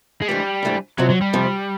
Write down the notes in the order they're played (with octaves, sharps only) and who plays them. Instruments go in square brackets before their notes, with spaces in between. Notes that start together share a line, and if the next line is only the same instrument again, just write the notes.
[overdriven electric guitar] G#3
[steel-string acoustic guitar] G#2 E3 A3 D4 [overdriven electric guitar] G3
[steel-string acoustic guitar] G#2 E3 A3 D4
[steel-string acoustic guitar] F2 C3 F3 [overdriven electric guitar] F#3
[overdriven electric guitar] F#3
G3
[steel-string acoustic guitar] F2 C3 F3